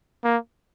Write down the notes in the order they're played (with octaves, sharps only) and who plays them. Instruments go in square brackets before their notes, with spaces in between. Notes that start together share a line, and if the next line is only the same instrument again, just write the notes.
[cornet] A#3